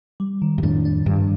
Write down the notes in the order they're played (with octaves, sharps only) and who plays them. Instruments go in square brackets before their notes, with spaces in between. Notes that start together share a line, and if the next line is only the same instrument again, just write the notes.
[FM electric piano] G3
D#3
[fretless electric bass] G2
[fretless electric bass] F2 A2 [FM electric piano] D4
[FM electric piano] D4
[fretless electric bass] G2 [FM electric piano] D#3